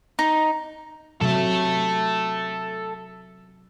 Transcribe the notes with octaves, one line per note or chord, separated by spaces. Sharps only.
D#4
C3 F#3 A4 E5